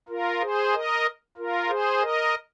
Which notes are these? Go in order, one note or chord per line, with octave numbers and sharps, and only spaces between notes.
F4 A#4
G#4 C5
A#4 D#5
F4 A#4
G#4 C5
A#4 D#5